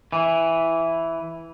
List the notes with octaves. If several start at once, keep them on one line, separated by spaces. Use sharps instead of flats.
E3